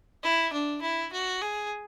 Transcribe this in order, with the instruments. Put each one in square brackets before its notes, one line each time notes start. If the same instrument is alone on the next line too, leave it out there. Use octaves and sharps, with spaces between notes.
[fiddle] E4
D4
E4
F#4
G#4